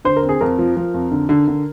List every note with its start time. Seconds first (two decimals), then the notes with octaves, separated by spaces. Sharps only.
0.05 D3 C5
0.16 A#4
0.23 C4
0.29 G#4
0.41 F2 A#4
0.59 F3
0.77 F3
0.94 F2
1.12 D3
1.29 D3
1.48 D3